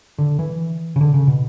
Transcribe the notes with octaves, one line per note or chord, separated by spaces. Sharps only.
D3
E3
C#3
D3
C#3
B2